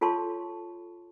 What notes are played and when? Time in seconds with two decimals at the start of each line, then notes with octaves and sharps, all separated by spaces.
0.01 F4 A4 C#5 A5 C6 C#6